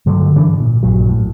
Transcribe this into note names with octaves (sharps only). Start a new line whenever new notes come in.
G2 D3 F#3 A3
G#2 E3 D4
A#2
A#1 G2 A#2 F#3
A2